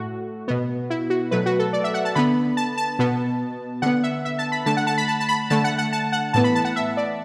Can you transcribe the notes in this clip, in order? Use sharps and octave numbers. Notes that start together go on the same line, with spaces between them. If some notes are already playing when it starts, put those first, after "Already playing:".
Already playing: A2 A3 F#4
B2 B3
E4
F#4
B2 F#3 A3 B4
F#4
A4
D5
E5
F#5
A5
D3 B3 B5
A5
A5
B2 B3
D3 B3 F#5
E5
E5
A5
B5
D3 A3 A5
F#5
A5
B5
A5
A5
B5
D3 A3 A5
F#5
F#5
A5
F#5
A2 E3 B3 A5
B5
A5
F#5
E5
D5